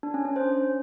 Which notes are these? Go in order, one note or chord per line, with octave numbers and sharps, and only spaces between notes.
D4
C#4
C#4
C5